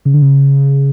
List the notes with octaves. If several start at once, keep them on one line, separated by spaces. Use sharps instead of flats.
C#3
D3
C#3